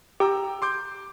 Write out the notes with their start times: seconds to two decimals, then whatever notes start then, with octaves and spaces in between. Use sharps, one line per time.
0.20 G4 G5 A#5 E6
0.62 C6 D6 G6